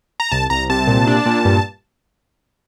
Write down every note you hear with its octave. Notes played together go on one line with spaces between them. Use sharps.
A#5
C2 A5
C2 A#5
C3 A5
A#2
D4
A#2
G2